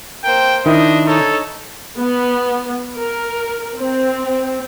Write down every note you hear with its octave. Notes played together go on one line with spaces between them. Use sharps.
A#3 C5 G5
D#3 D4 E4 D#5
D#4 A4 C#5
B3
A#4
C4